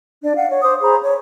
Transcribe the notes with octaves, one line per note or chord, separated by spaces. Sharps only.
D4 D5
F5 F#5
C#5
C5 D6 D#6
G#4 C5 A#5 B5
C#5